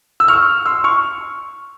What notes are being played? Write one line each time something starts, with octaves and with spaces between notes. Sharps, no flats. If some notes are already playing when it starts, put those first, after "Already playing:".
E6
C#6 F6
C6 E6
C#6 F6